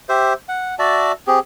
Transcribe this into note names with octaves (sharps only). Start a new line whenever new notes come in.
G4 C5 E5
F#5
F#4 D5 E5 A5
C4 G4 G#4